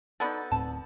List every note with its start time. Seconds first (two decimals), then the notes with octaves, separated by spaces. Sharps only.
0.20 B3 D#4 F#4 A4 D5
0.52 D1 A2 C4 A5